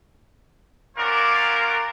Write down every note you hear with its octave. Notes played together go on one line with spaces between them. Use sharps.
C#4 F4 F#4 A#4 C5 D5